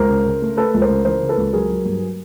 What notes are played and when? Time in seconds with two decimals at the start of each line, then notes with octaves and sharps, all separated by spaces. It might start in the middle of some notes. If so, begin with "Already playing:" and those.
Already playing: C#2 A#4 C5
0.09 C#3
0.26 C#3
0.42 A3
0.57 A3 A4 B4
0.74 C#2
0.82 A#4 C5
0.90 C#3
1.05 E3 A#4 C5
1.22 C#3
1.29 A4 B4
1.38 C#2
1.53 F#3 G#4 A#4
1.70 F#3
1.85 G2